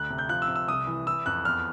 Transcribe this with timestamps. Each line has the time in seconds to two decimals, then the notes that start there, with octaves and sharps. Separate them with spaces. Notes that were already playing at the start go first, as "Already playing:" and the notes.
Already playing: D2 F#6
0.10 C3
0.18 G6
0.29 F3 F#6
0.42 E6
0.48 C3
0.56 E6
0.68 C2 D#6
0.87 E3
1.07 E3 E6
1.26 F2 F#6
1.45 E2 F6